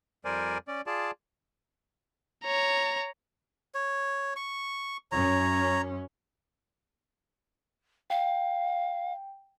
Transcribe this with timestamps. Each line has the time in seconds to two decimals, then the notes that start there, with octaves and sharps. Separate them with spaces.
0.25 F2 G3 A#4 C5 D5 G#5
0.68 C#4 D5
0.87 F4 G#4 D5 A5
2.44 C#5 A#5
3.75 C#5
4.36 C#6
5.12 F#2 C#4 C#5 A#5
8.10 F5 G5